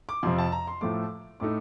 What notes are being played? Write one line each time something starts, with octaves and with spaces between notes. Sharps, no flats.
D6
F2 C3 F3 C6
A5
A#5
C6
A2 F3 A3 D6
A2 A3 D#4 D6